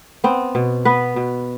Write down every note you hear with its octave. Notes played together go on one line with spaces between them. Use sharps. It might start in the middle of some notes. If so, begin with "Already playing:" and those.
B3 C4
B2
B3 B4
B2